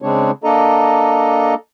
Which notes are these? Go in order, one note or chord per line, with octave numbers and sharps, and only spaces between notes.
C#3 G#3 C4 D4 C#5
A#3 D4 A4 D#5 A#5